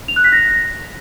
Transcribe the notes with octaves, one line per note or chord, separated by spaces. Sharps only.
F7
F#6
B6
A#6